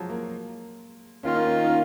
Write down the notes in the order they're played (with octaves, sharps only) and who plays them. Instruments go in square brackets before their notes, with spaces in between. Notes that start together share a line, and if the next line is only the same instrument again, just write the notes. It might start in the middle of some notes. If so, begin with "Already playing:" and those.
Already playing: [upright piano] F3 F#3 G#3
A#3
[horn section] D#3 A#3 F4 [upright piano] C#4
[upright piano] D#4
C#4
D#4
C#4